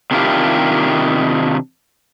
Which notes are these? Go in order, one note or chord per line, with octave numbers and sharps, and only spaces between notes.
C3 D#3 D4 E4 F4 G4